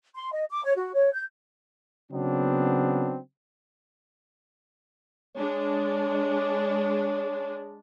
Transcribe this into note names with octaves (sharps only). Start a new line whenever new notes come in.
C6
D#5
D6
C#5
F#4
C#5
G6
C#3 F#3 B3 C4 D4
G#3 D4 C#5